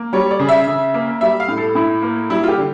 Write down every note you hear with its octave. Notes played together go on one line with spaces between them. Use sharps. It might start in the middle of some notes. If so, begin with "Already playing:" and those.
Already playing: A#3
G3 C#5
D5
C#3
E5
C#3
A#3
G3 E5
F5
A2
A4
A2 E4
A#3
G3 E4
F4
G4
D3